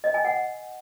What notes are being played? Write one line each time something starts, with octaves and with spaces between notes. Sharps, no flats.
D#5
G#5
F#5